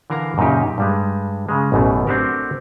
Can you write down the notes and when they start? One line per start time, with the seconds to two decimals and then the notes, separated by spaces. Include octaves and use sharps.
0.10 D3 E3 A#4 F5 A#5
0.38 F#2 A#2 C#3 D#4 G4
0.78 G2 G3 G#3
1.49 C#3 G#3
1.72 A1 F#2 B2 E3 A3
2.07 A3 C4 D4 F#4 G4 A#4